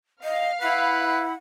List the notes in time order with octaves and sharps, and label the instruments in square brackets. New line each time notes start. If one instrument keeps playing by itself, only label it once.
[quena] D#5 [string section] F5
[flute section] E4 B5 [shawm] B4 [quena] F#5